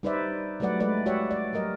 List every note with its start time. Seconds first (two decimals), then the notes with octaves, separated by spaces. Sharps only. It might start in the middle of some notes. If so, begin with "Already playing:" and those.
0.03 G3 D#4 B4 C5 D5 E5
0.60 F#3 G3 A3 B4 D5 F#5
0.80 G#3 A3 B4 D5
1.06 F#4 G4 C#5 D5 E5 F#5
1.31 D5
1.53 F#3 G3 A#4 D#5